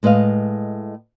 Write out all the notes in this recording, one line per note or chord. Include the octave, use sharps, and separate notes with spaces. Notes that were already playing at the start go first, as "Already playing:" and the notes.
A2 G#3 B4 D#5 F5